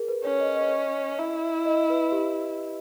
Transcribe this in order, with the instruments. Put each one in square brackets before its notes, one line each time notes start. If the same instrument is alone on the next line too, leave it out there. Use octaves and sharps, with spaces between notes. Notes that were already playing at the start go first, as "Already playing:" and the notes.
Already playing: [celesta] G#4 A#4
B4
[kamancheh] C#4 [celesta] C#5
[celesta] D#5
D#5
[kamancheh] E4 [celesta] E5
[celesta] D#5
B4
G4